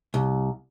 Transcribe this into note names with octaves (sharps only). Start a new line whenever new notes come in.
C2